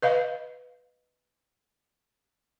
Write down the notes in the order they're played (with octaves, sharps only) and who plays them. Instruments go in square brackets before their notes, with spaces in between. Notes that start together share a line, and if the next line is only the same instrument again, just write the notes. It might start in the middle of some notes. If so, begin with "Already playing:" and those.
[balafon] B4 D#5 F5